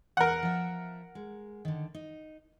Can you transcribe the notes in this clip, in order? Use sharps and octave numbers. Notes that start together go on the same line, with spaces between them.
E2 A#4 B4 F#5
F3 E5
G#3
D3 D#3
D#4